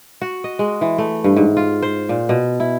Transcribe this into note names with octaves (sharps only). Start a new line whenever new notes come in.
F#4
D#5
G#3
E3
A3
G2
G#2
F4
C5
A#2
B2
E4